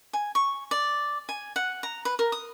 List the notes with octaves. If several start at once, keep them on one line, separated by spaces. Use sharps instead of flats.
G#5
C#6
D5
G#5
F#5
A#5
B4
A#4
D#6